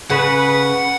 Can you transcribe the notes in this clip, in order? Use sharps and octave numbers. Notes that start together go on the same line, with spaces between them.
C#3 B4 F#5